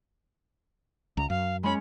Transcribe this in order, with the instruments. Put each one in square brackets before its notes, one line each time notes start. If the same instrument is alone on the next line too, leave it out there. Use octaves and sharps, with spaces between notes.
[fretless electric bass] C#2 [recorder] A#5
[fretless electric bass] F#2 [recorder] F5
[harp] G#3 C#4 [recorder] B5